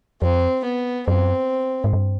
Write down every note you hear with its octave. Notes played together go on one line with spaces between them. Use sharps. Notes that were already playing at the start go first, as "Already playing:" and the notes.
F2 C4
B3
F#2 C4
G#2
G2